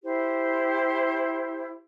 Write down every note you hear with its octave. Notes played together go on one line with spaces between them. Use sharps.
E4 G4 C5